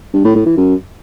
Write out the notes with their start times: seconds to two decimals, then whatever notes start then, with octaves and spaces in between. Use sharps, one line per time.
0.14 G2
0.24 A2
0.35 A2
0.46 E3
0.57 F#2